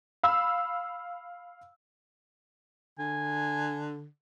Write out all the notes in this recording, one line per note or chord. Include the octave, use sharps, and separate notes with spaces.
F5 B5 E6
D3 G#5